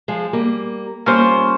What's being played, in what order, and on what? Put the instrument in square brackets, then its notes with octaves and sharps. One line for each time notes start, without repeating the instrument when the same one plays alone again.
[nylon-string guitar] F3 G#3
G3 A#3
[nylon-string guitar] G3 A#3 [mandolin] C#4 F4 C5